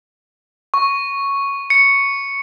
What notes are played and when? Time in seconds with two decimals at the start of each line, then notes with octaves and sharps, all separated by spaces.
0.74 C#6
1.70 C#7